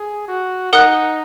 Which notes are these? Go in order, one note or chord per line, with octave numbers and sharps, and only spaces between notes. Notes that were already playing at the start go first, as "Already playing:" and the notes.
Already playing: G#4
F#4
D#4 A#4 F#5 D#6 F#6